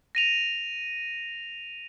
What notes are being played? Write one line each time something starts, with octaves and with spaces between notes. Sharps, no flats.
A#6 D#7 F7